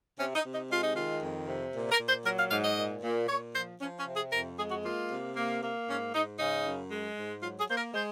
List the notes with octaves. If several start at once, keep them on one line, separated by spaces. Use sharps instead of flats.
C3 C#4
D#4
C3
D#4
G#3 F4
D#4
D#3 F4
F2
C3
A#2
A#4
A#2
C5
F#3 A#4
F5
G#2 F5
D#5
A#2
A#2
A#2 C#5
F3 C5
F3 C#4
C#4
C3
G#4
F2 A#4
G#3 G#4
F#4
A#3 F4
C3
A#3
A#3
G#2 C#4
G#2 D#4
C#3 D#4
F#2
G#3
G#2
F#3 F4
G#4
A#3 C5
A#4
G#3 C5